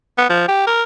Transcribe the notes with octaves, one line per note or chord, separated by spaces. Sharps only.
B3
F3
G4
A#4